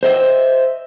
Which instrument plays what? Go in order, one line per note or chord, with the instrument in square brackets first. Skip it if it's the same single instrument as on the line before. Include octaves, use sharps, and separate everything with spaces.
[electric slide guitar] C5 D#5 E5